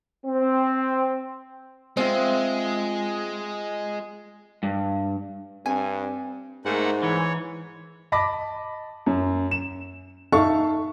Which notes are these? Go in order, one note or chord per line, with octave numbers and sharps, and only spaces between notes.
C4
G#3 C4 F4 E5
G2
G2 C4 G#5
G#2 A3 A#3 F#5
E3 C#5
D#5 A5 B5 D6 A#6
F#2
E7
D#4 A4 E5 F5 A5 C#6